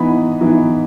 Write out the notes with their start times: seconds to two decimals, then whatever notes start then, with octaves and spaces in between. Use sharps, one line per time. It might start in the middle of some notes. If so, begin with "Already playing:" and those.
Already playing: E3 B3 D#4 B5
0.41 E3 B3 D#4